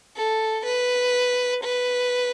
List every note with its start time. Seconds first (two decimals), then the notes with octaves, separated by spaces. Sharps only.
0.16 A4
0.65 B4
1.63 B4